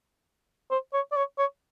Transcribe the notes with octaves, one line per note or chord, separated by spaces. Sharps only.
C5
C#5
D5
C#5
C#5